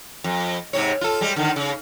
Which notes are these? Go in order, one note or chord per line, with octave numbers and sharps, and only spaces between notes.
F2
G#2 C3 C#5
F4 A4
G3 G#3
D3 D#3
C#3